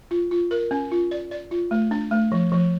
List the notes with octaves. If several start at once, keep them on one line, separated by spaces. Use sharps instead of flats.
F4
F4
A#4
C#4
F4
D5
D5
F4
A3
D4
A3
F3
F3